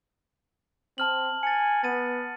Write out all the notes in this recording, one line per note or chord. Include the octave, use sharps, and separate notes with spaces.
C4 A5 F6 F#7
G#5 A6 C#7
B3 A6 D#7